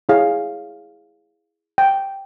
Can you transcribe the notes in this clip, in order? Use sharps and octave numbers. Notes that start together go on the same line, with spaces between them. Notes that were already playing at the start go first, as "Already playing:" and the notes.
E4 G#4 C#5 F5
G5